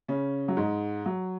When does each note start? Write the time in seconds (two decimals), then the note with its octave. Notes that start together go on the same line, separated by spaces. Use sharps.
0.08 C#3 C#4
0.48 F#3
0.57 G#2 G#3
1.06 F#3